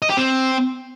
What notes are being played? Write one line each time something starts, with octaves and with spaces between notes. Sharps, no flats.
D#5
G4
C4